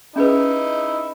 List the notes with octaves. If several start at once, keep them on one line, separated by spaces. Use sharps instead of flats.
C#4 D#4 E4 G#4 B4